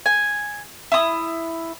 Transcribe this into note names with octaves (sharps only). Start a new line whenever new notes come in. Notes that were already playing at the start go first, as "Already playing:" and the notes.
G#5
E4 D#6